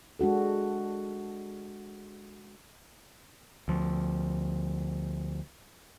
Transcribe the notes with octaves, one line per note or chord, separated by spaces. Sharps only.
G#3 D4 F#4 A4
D2 F3